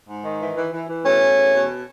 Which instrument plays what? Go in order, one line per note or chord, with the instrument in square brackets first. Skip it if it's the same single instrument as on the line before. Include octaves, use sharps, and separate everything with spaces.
[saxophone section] G#2
D#3
E3
E3
E3
E3
B2 A3 C#4
B2
E2
B2